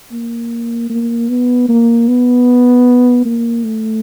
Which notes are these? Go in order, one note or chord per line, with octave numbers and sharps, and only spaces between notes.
A#3
A#3
B3
A#3
B3
A#3
A3